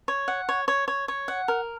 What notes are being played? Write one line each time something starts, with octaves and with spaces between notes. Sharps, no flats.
C#5
F#5
C#5
C#5
C#5
C#5
F#5
A#4